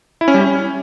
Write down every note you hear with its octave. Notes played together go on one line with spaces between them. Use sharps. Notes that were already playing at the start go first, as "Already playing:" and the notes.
E4
C#4
G3
C#4